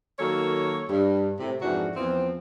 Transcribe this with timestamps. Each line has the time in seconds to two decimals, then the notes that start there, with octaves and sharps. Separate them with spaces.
0.19 D#3 F#3 A#3 F#4 A4 C#5
0.89 G2
1.40 A2 C3
1.62 F2 G#2 E3 D4 F#4
1.96 E2 E3 F3 C4